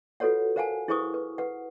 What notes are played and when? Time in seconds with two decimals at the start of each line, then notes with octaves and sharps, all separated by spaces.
0.20 F4 F#4 A4 B4 C#5 F#5
0.56 A#4 C5 F5 F#5 G#5 A5
0.88 E4 G#4 B4 C5 C#6 D#6
1.14 B4
1.38 B4 F#5